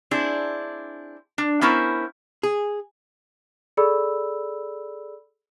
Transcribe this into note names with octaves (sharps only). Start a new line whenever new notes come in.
C4 D4 E4 G#4
D4
B3 C#4 E4 A#4 C5
G#4
G#4 A4 D5 B5 E6